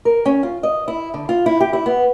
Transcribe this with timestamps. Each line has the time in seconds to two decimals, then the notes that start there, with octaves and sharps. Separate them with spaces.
0.05 A#4
0.26 C#4
0.43 F4
0.63 D#5
0.88 E4
1.14 D3
1.29 F4
1.46 E4
1.60 G4
1.73 E4
1.86 B3